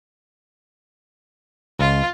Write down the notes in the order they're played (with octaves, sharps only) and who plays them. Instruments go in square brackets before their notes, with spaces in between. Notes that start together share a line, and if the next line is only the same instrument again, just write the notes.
[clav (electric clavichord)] C#2 [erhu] F4